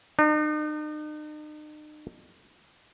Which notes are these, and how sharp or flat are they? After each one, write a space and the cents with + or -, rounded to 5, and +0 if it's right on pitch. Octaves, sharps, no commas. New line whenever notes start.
D#4 -45